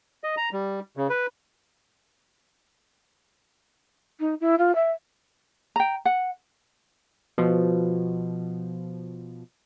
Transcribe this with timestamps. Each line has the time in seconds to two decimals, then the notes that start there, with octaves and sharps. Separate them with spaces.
0.24 D#5
0.37 A#5
0.53 G3
0.97 C#3
1.09 B4
4.20 D#4
4.40 E4
4.58 F4
4.75 E5
5.76 G5 A#5
6.05 F#5
7.38 B2 F3